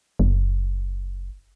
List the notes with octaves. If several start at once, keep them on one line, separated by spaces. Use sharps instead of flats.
F#1